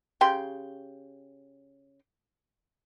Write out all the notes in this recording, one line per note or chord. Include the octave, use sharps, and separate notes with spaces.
C#3 G4 G5 C6